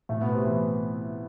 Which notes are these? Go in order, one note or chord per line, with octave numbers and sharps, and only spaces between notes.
A2 A3
B2 B3
C3 C4
E3 E4